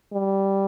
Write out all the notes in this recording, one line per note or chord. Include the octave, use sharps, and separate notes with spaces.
G3